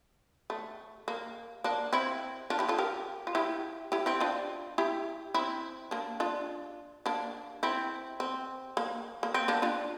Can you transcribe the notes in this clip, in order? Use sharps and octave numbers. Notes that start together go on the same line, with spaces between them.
A3
A#3
A#3 D4
C4 E4
D4 F4
E4 G4
F4 A4
G4 A#4
F4
E4 G4
E4 G4
C4 E4
D4 F4
E4 G4
C4 E4
A#3 D4
D4 F4
A#3 D4
C4 E4
C4
A#3
A#3
C4
A#3 D4
D4 F4